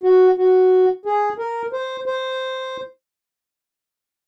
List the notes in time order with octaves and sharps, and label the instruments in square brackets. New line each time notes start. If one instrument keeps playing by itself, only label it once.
[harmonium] F#4
F#4
G#4
A#4
C5
C5